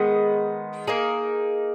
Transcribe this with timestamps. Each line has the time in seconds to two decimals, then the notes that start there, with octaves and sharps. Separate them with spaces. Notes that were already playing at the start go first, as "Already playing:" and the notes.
Already playing: D#3 G#3 B3
0.87 A#3 D#4 G#4